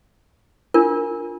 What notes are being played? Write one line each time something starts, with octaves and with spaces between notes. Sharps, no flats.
D4 F4 A#4